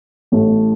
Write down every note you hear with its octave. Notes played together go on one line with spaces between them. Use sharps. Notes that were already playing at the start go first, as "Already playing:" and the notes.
A1 A2 A3